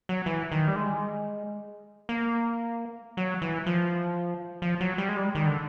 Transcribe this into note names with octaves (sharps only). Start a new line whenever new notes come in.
F#3
E3
D#3
G3
G#3
A#3
F#3
E3
F3
F3
F#3
G3
G#3
G3
D#3
D3